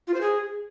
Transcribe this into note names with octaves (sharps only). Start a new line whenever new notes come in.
F4
C5
G#4